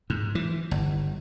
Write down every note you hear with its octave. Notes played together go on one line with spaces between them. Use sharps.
G#2
E3
G1